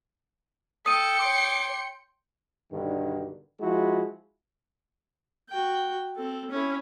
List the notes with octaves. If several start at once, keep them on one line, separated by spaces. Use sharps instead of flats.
A4 G5 D#6 C#7 D#7
C#5 C6 D6
B1 G2 D3 D#3
F3 G#3 E4 F#4
F#4 G5
C4 A4
C#4 E4